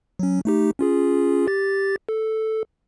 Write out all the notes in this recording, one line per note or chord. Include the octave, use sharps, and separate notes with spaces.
F#3 C#4
A3 D#4 G4
C#4 F4 G#4
G4 A6
A4